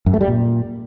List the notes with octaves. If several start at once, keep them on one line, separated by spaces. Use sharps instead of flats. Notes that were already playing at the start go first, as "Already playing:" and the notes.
F#2
A3
G3
A#2